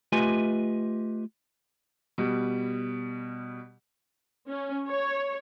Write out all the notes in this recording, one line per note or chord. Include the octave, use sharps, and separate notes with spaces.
A3 F4 G4 B4 D#5 G#5
B2 G3
C#4
C#5